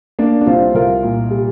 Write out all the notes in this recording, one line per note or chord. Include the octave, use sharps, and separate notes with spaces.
A#3 D4
D4
C2 C4 F4
C2 F4 A#4
A#2
G3